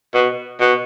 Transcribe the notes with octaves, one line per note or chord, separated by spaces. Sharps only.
B2
B2